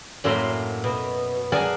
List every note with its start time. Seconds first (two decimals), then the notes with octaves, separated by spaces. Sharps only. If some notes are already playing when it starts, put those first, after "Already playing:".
0.24 F#2 A2 F#3 A#3 E5 C6
0.84 B2
1.52 G#4 A#4 D5 F#5 G#5 A5